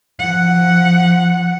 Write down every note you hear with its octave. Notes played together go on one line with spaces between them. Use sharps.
F3 F#5